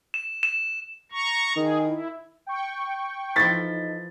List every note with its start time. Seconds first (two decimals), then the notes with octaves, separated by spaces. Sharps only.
0.14 E7
0.43 E7
1.12 A#5 C#6
1.56 D#3 G#4
1.87 E4
2.46 G5 C#6
3.36 E3 F3 D#4 A4 A6 B6